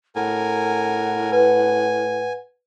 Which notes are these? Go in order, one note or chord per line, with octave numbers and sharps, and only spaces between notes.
A2 A#4 F#5 G#5
B4 G#5